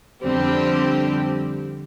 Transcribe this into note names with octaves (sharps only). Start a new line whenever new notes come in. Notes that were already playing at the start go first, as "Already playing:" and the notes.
F2 D3 G3 C4 G4